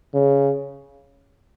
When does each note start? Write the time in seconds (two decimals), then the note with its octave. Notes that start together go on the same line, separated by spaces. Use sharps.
0.14 C#3